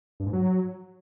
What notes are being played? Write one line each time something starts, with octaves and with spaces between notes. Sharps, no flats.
G2
G#2
F#3